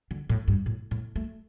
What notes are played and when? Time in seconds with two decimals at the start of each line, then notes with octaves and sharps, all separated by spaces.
0.11 D3
0.29 A2
0.48 G2
0.66 A2
0.91 A2
1.16 A3